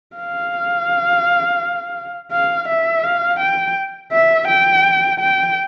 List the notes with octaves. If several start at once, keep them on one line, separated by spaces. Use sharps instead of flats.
F5
F5
E5
F5
G5
E5
G5
G5